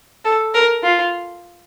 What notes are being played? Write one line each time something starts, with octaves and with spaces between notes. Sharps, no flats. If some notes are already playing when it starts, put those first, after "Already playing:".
A4
A#4
F4